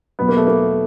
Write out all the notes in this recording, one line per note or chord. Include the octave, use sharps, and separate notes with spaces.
E2 B2 F#3 B3
A#3
A3
A#3